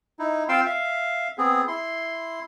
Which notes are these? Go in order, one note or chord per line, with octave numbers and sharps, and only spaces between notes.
D#4 E4
C4 F4 F5 G5 C6 E6
E5 F5
B3 C4 G#4
E4 C6